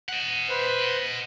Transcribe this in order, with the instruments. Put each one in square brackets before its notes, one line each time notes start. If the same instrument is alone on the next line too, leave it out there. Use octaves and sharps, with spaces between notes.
[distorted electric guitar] D#5 F#5
[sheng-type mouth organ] B4 C5